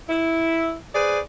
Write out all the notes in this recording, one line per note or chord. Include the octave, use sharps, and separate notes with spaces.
E4
G#4 B4 C5 D5